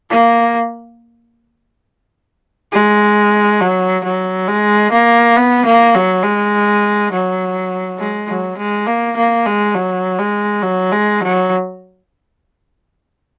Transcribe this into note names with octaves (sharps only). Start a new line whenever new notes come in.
A#3
G#3
F#3
F#3
G#3
A#3
B3
A#3
F#3
G#3
F#3
G#3
F#3
G#3
A#3
A#3
G#3
F#3
G#3
F#3
G#3
F#3